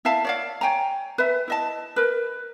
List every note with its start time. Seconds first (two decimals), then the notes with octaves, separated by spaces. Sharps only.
0.05 E4 E5 F5 A5
0.25 C#5 D5 F5
0.61 C#5 G5 G#5 A#5
1.18 B4 E5
1.48 E4 D#5 A5
1.96 A#4 B4